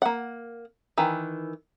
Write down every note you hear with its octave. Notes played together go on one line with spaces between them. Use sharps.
A#3 F#5
D#3 E3